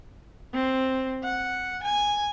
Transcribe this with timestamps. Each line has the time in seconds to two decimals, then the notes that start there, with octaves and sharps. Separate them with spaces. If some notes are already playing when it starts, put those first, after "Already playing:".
0.54 C4
1.24 F#5
1.84 G#5